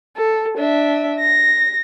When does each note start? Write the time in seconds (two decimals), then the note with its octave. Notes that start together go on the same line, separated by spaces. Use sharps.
0.16 A4
0.58 D4 E5
1.20 A#6